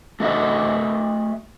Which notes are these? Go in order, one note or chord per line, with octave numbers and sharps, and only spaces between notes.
A3 F#4 D#5 E5 F#5